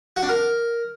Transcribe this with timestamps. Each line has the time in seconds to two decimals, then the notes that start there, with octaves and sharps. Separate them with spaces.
0.16 F#4
0.23 D4
0.29 A#4